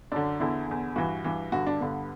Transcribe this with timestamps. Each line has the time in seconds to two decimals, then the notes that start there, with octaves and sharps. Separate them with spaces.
0.12 F#2 D3 D4
0.40 E2 D3 E4
0.68 E2 D3
0.96 G2 E3 F#4
1.24 G2 E3
1.52 G2 D3 F#4
1.67 D4
1.80 G2 D3 B3